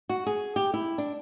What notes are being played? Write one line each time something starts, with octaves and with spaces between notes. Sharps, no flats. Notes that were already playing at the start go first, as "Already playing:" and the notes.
F#4
G#4
G4
E4
D4